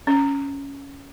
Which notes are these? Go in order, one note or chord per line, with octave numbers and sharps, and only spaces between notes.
C#4